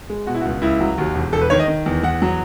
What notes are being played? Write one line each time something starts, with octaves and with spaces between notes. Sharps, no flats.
G#3
B2 F#4
E4
C#2 F#4
C#2 E4
F#3
D#2 F#4
E1
E1 A4
B4
D#3 C#5
D#5
D#3
E2
E2 F#5
F#3